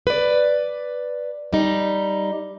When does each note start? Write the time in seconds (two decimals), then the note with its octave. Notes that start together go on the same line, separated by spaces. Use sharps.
0.07 B4 D5
1.53 G3 D#4